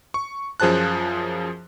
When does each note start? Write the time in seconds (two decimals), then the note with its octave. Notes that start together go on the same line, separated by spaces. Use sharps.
0.14 C#6
0.60 F#2 F3 G#4 C5 A5 F#6